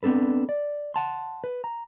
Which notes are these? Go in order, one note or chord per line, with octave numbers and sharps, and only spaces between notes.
B3 C4 D4 A4 B4
D5
F#5 A5 C6
B4
A#5